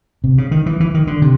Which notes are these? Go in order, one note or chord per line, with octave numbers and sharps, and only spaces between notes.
C3
C#3
D#3
E3
E3
D#3
D3
C3